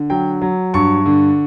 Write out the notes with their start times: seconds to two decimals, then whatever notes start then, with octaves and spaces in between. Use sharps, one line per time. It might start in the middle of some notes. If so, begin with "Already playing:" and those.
Already playing: D3
0.10 F#3 G5
0.41 F#3
0.74 G2 C#6
1.06 D3